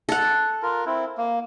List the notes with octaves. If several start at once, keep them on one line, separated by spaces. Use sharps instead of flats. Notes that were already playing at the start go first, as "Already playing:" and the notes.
A4 F#5
F4 A#4
C4 E4
A#3